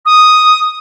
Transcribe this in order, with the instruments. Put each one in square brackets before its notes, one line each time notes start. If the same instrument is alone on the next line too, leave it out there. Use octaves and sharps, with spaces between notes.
[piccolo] D#6